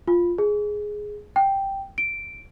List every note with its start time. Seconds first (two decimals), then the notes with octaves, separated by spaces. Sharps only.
0.08 F4
0.38 G#4
1.36 G5
1.98 D7